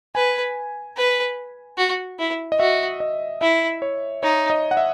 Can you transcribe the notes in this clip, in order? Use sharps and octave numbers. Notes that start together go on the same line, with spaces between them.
B4 G#5
B4
F#4
E4
D#5
F#4 E5
D#5
E4 E5
C#5
D#4 C#5
D#5
F#5
E5